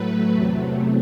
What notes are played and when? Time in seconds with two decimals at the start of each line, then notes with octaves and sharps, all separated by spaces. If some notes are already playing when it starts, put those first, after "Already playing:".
Already playing: A2 F#3 A3 B4
0.33 E2 C3 F#3 A3